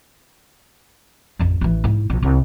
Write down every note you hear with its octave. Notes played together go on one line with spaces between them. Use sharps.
A1 F2
A1 E3
G#2 E4
A#1 A#2
C2